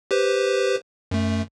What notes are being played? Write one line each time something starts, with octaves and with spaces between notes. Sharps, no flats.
G4 B4 C5
F#2 A3